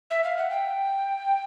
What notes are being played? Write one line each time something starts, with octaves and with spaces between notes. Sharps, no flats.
E5
F5
F#5
G5